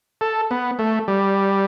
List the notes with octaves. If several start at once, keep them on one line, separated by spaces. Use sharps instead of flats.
A4
B3
A3
G3